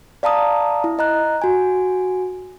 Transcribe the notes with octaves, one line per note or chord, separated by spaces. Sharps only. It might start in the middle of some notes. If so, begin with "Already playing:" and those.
D5 F5 A5 A#5 D#6
E4
D#5 A#5 F#6
F#4 G#5